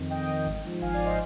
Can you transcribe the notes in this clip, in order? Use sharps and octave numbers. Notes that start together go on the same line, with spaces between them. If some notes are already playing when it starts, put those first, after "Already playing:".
Already playing: F2 D#3
F2 D#5 G5
D#3
G#1
G#2 F3
G#1 F5 G#5
D5 F5
F3
C5 D#5